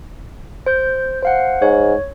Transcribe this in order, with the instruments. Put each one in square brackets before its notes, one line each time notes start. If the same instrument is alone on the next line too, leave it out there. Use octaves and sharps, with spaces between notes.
[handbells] C5 G6
C5 F5 F#5
[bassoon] G#2 [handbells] C#5